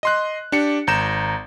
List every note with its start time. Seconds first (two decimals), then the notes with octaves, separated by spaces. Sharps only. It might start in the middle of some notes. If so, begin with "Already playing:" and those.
0.03 D#5 C6 F#6
0.52 D4 G4 C#7
0.87 G#1 A#5 G6 E7